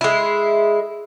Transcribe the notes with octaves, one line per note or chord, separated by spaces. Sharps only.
G#3 E4